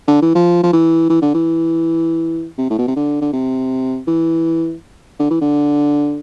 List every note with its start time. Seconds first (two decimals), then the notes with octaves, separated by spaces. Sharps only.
0.08 D3
0.22 E3
0.35 F3
0.64 F3
0.73 E3
1.10 E3
1.22 D3
1.35 E3
2.58 C3
2.70 A2
2.79 B2
2.88 C3
2.96 D3
3.21 D3
3.33 C3
4.08 E3
5.20 D3
5.31 E3
5.41 D3